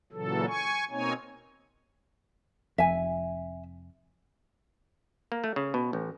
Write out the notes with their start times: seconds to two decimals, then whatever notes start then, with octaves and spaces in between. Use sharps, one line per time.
0.12 A#2 C#3 E3 F#3 A4
0.47 G#5 C#6
0.91 B2 A#3 C4 D#4 C#5 G#5
2.78 F1 F2 E5 G#5
5.32 A#3
5.44 A3
5.56 C#3
5.74 B2
5.93 A1